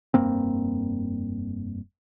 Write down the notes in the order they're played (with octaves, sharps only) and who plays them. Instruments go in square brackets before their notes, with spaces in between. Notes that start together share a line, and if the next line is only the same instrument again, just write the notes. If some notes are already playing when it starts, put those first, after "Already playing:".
[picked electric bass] F1 G2 A#3 C4